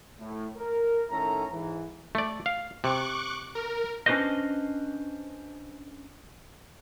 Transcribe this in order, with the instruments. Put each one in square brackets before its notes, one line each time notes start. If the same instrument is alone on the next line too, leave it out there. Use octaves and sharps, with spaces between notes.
[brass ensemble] A2
A#4
A2 D#3 C#4 A4 E5 A#5
G#2 E3
[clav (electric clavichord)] A3 D5
F5
[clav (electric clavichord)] C3 [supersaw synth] C#6 D6 F#6
[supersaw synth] A#4
[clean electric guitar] C#4 D4 G4 B4 C5 D#5